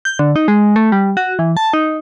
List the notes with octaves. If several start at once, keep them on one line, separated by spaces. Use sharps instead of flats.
G6
D3
D#4
G#3
A3
G3
F#4
E3
A5
D#4